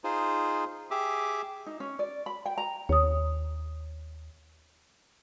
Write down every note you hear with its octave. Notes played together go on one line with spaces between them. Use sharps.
D#4 F4 G#4 C5
G4 G#4 E5 D6
D#4
C#4
D5
B5
G5
A#5
D#2 C#5 D#6